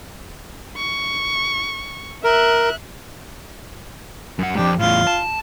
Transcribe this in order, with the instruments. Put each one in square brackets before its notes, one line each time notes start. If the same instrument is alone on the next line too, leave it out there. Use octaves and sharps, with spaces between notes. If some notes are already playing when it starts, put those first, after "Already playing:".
[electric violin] C#6
[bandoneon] A#4 [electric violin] E5 F#6
[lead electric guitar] F#2 F#5
[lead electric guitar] F2 G#2 [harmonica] D4 G4
[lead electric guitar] E2 A2 [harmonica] F4
[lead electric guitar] A5